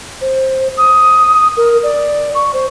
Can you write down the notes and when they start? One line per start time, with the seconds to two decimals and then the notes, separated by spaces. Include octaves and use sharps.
0.21 C5
0.77 D#6
1.57 A#4
1.83 D5
2.35 C#6
2.53 C5